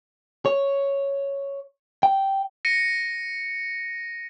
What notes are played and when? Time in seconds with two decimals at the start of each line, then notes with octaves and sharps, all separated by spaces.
0.46 C#5
2.03 G5
2.65 A#6 C#7 D#7